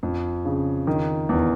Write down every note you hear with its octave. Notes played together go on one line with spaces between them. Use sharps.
F2
C#3
D#3
E2